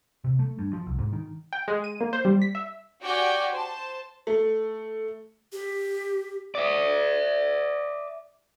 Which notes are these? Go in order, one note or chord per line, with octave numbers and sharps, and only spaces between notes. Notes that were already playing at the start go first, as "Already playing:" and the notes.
C3
A3
G2
F3
C2
G#2
D#3
G5
G#3
D#7
A#3
C5
G3
B6
E5
F#4 G4 D5 G5 G#5
C5 A5
A3
G4
D5 E5